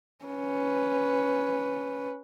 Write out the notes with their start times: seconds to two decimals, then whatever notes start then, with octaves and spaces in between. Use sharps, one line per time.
0.25 C#4 B4